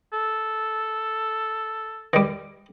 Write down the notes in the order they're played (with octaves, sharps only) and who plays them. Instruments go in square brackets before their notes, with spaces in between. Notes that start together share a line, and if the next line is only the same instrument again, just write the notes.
[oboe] A4
[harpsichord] D#3 G3